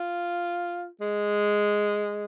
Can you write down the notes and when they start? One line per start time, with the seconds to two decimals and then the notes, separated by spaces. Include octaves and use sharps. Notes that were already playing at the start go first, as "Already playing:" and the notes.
Already playing: F4
1.01 G#3